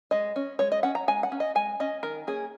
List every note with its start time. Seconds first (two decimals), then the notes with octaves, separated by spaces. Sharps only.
0.11 G#3 D#5
0.36 C#4
0.59 G#3 C#5
0.72 D#5
0.83 C#4 F#5
0.95 A#5
1.08 G#3 G#5
1.23 F#5
1.32 C#4
1.40 D#5
1.55 G#3 G#5
1.80 C#4 D#5
2.03 D#3 A#4
2.27 A#3 C#4 G#4